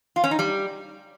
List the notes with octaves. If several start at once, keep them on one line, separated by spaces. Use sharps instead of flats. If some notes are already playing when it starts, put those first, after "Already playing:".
F4
C#4
D#4
G3